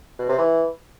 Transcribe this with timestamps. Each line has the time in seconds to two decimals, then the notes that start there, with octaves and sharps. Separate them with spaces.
0.19 B2
0.29 C3
0.39 E3